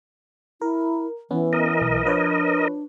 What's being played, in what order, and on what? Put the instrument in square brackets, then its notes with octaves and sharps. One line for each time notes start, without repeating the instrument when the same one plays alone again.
[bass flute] E4 [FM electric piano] A#4
[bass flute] E3 [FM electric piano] B3 C#4
[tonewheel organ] A#4 D#5
[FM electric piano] B1
[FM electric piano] F3 B4 C#5 [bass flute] D4